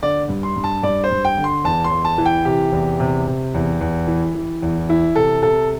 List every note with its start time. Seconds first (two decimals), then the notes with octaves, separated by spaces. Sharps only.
0.02 D3 D5
0.29 G2
0.43 C6
0.57 G2
0.64 A5
0.83 G2 D5
1.04 C5
1.11 G2
1.25 G5
1.38 D3
1.44 C6
1.64 E2 A5
1.84 C6
1.91 E2
2.05 A5
2.18 E3
2.26 G5
2.45 C3 G4
2.72 E2
3.00 C3
3.27 C3
3.54 E2
3.81 E2
4.07 E3
4.35 E3
4.62 E2
4.89 E3 E4
5.16 C3 A4
5.43 C3 A4